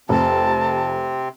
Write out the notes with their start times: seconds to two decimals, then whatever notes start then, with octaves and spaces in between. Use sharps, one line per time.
0.09 F1 C3 C4 A5